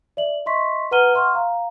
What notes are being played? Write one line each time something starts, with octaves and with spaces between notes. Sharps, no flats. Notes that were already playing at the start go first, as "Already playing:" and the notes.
D5 E5 F#7
D#5 E5 C6 C#6 B6
B4 F#5 A#5 F6 D#7 G7
E5 F#5 C6 C#6 F6
F5 A#5